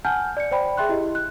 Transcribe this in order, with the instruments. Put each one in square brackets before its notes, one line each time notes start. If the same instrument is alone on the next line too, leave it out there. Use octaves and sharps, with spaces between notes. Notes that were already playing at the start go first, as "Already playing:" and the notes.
[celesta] F#5 G#5 A5 F6 G6
D5 C#7
C5 D5 G5 B5
G#4 E5 G5 C6 F#6
E4 G4 D#5
F#6